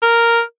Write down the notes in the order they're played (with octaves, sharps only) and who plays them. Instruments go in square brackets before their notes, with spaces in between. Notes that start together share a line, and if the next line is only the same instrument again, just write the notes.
[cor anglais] A#4